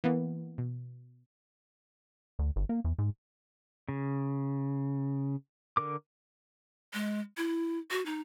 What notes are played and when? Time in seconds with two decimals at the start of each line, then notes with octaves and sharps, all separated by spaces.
0.04 E3 A#3 B3
0.58 B2
2.39 D2
2.56 G1
2.69 A#3
2.84 E2
2.98 G#2
3.89 C#3
5.77 D3 A#4 D6
6.94 G#3
7.37 E4
7.91 F#4
8.06 D#4